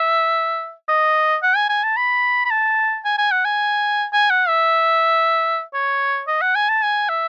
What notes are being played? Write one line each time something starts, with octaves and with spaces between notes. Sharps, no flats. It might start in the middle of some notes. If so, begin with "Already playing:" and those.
Already playing: E5
D#5
F#5
G#5
G#5
A5
B5
B5
A5
G#5
G#5
F#5
G#5
G#5
F#5
E5
C#5
D#5
F#5
G#5
A5
G#5
E5